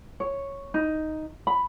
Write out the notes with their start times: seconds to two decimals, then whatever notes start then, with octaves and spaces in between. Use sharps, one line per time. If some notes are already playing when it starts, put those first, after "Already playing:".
0.20 C#5
0.74 D#4
1.47 B5